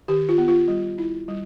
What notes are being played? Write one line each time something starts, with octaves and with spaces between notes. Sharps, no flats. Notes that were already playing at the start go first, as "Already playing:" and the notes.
D#3 G4
F4
B3
F4
G3
E4
G3